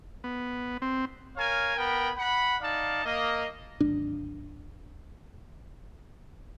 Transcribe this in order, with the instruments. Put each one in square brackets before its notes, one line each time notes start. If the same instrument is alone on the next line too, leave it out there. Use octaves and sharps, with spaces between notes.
[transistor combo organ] B3
C4
[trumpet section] A#4 C#5 F5 G#5
B3 A#4 G5 B5
F#5 B5
D#4 D5 F5 A5
A#3 D#5
[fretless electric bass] D1 G#1 D4